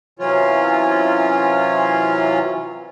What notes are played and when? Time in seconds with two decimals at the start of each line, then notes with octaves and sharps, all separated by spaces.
0.19 C3 E3 F#3 C#4 F4